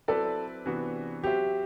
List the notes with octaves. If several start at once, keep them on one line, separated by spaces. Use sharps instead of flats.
F#3 C4 E4 A4 B4 D5
C3 E3 B3 D4 F#4
F#3 C4 F#4 G4 C5 E5